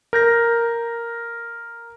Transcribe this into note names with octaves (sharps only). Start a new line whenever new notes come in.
A#4 G6 A#6